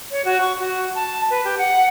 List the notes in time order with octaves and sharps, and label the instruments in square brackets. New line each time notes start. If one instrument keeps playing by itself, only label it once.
[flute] C#5
F#4
C#6
F#4
A5
B4
G4
F#5